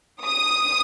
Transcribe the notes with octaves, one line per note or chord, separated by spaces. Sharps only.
D#6